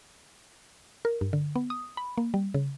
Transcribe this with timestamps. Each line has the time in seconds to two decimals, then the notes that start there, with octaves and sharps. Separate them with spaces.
1.05 A#4
1.21 G2
1.33 D3
1.56 B3
1.70 D#6
1.97 B5
2.18 A#3
2.34 G3
2.54 C#3